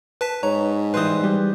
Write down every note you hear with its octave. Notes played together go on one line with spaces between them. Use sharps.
B4 A5 B6
G#2 C#5 A#5
E3 G3 B4 C5 D#6
G3 G4